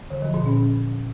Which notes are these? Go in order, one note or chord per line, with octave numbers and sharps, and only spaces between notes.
D3
F3
A#2
C#4